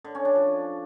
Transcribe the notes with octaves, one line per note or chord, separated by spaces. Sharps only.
D3
C#4
D4
F3